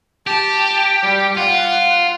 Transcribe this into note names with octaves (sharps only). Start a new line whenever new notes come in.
G4 A5
G3
F4 F#5